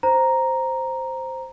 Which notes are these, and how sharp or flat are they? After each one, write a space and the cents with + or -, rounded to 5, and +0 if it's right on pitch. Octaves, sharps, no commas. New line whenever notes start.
C5 +0 A#5 +0